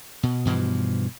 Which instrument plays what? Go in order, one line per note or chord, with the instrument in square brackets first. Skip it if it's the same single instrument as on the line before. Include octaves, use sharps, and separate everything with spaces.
[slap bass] B2
G2 B2 E3 F3